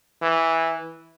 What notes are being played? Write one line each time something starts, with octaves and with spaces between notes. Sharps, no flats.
E3